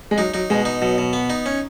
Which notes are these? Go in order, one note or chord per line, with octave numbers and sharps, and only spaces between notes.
G#3
F#3 D#4
F#3 D#4
B2 G#3
D#4
B2 F#3
B2
B3
D#4
C#4